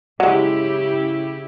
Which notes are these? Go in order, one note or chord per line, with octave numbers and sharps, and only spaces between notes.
C#3 F#3 G#3 E4 G4